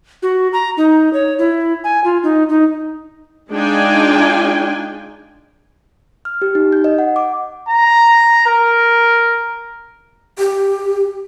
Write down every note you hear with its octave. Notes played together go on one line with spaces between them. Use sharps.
F#4
A#5
D#4
C#5
E4
G#5
F4
D#4
D#4
G#3 D4 D#4 F4 G5 G#5
F6
G4
D#4
G6
D#5
F#5
D6
A#5
A#4
G4